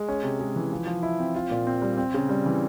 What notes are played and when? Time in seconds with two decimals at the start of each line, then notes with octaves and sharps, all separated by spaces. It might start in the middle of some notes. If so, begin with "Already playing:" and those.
Already playing: G#3
0.08 C#4
0.23 C3
0.40 G#3
0.56 E3
0.72 F3
0.87 F3
1.03 E4
1.19 C4
1.34 F4
1.51 A#2
1.67 C4
1.82 G3
1.97 C4
2.14 C#3
2.29 G3
2.46 E3